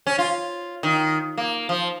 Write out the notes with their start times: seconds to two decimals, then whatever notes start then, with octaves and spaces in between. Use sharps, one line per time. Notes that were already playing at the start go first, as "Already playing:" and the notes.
0.07 C#4
0.19 F4
0.83 D#3
1.38 A#3
1.69 F3